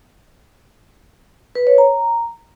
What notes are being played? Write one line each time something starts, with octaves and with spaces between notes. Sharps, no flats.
B4
C#5
A#5